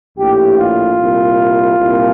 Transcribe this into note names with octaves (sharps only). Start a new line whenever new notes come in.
A#1 A2 G4
F4
C2 A#2
C2 A#2